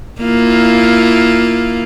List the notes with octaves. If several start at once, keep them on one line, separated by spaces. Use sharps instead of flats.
A#3 E4 F4